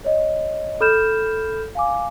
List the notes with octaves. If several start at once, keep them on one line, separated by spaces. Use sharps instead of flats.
C#5 D#5
A4 B5 F6 G6 E7
F5 G#5 D6